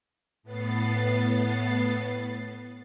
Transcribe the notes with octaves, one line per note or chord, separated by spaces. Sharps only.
A2 B3 A6 C7